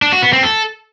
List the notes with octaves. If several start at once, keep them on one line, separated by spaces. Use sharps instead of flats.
D4
F#4
B3
C4
A4